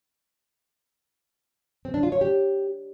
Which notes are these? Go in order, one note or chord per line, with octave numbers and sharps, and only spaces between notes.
C4
D4
F4
C#5
G4